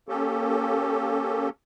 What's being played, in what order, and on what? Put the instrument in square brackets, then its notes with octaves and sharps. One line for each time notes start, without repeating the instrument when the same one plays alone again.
[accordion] A#3 C#4 G4 A4